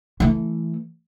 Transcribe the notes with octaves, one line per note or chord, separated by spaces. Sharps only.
E3 A3